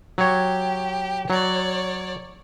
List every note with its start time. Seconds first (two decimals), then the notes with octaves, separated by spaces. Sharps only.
0.18 F#3 G4 C#5
1.30 F#3 C#5 D5